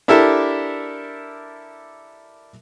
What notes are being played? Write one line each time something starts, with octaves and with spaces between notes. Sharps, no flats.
D4 E4 G4 A4 A#4 E5